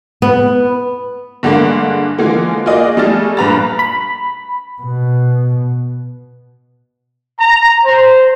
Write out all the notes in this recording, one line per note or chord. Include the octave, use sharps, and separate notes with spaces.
B3
G2 D3 G#3 A#3
D3 E3 F3 G#3 A#3
A#3 F4 F#4 G#4 D5 D#5
G3 A3 G#4 A4 F6 A6
G2 A#2 B4 A#5 B5 A6
B5
B2
A#5
C5